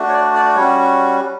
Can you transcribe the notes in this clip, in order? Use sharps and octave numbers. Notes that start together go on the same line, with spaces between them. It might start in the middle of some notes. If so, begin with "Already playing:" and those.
Already playing: A3 D4 F#4
C#5
D5
D5
G3 C#4 F#4 C#5